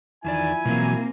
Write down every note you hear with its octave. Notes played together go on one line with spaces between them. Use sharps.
E2 D#3 F3 E4 D5 G#5
B2 E3 F#3 A#3 C4